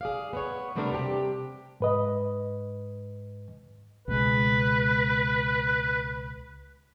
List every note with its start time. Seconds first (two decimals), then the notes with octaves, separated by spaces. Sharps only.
0.01 G#4 D5 F5
0.33 B3 C#5
0.76 C3 G3 A3 B3 D4 A#4
0.92 C3 D4 G4
1.80 G#2 B4 D#5
4.08 C#2 B2 G#3 B4